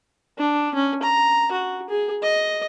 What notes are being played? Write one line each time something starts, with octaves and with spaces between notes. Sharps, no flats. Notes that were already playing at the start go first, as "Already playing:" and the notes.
D4
C#4
A#5
F#4
G#4
D#5